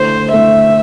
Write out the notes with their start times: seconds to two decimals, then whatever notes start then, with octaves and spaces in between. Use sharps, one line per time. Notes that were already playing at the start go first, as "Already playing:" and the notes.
Already playing: D3 A3 E4 A4 C5
0.32 D3 A3 E4 A4 E5